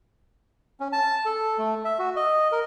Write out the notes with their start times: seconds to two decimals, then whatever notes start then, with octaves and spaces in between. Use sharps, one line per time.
0.80 C#4
0.93 A5
1.26 A4
1.58 A3
1.85 E5
1.99 F#4
2.16 D#5
2.52 A#4